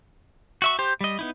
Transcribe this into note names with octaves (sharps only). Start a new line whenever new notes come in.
F#4 E5 C#6
G4 C5
G3 D#5
B3 D#4 E4